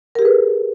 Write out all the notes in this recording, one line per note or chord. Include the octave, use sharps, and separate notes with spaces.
G4 G#4 A#4 B4